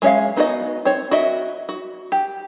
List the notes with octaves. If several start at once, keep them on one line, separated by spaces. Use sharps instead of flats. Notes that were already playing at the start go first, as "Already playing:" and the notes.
G#3 C#4 C#5 E5 F5
B3 D#4 F#4 A#4 D#5
C4 C#5
F#4 A#4 D#5 E5
F#4
G4